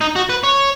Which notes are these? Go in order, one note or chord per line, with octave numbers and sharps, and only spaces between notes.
D#4
F#4
B4
C#5